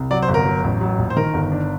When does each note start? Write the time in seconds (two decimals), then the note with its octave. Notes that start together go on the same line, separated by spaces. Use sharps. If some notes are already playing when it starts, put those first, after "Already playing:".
Already playing: C2
0.11 F#3 D5
0.23 C5
0.29 G1
0.34 A#4
0.46 F#3
0.64 A1
0.81 F#3
0.99 A#1
1.10 C5
1.16 D#3 A#4
1.34 G1
1.52 D4